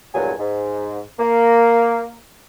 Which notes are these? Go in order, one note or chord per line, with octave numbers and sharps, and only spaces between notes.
E2 G2 A#2 F#3 G#5
G#2
A#3